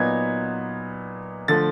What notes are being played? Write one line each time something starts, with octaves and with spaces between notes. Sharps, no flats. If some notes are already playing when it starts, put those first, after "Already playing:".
Already playing: A#2 F#3 B3 D#4 G#6
D3 F3 A3 A6